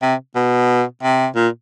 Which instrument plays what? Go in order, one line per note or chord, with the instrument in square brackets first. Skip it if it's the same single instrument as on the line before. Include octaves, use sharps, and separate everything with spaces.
[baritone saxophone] C3
B2
C3
A#2